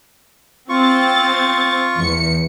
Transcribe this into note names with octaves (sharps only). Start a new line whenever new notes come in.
C4 F4 C#6 A6
E2 C#7